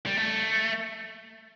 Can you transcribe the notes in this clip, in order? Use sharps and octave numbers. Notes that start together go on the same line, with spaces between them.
G3
A3